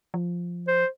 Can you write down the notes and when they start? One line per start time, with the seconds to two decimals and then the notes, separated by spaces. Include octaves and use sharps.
0.14 F3
0.67 C5